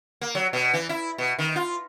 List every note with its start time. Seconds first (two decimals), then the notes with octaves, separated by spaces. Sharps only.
0.21 A#3
0.35 F#3
0.53 B2
0.74 E3
0.89 E4
1.18 B2
1.39 D#3
1.56 F4